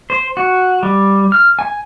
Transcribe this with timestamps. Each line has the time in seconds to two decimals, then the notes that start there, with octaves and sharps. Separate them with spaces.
0.10 C5
0.37 F#4
0.83 G3
1.32 F6
1.59 G#5